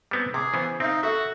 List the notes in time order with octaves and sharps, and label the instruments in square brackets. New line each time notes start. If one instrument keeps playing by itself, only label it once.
[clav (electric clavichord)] G3 B3 C4
[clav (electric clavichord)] C3 [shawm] G#4 [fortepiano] D6
[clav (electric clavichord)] C#3 E3 B3 [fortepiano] C5
[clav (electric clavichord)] C4 [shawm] D#4 [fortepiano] E5 F5
[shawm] F#4 [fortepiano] A4 E5